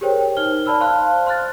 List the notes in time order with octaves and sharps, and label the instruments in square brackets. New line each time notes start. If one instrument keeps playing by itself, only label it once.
[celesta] G4 G#4 A#4 C5 C#5 G5
D#4 C5 F6 G7
C5 D5 A5 B5 E6 F6
C5 F5 A5 C6 F6 F#6
C6 F6 F#6 A6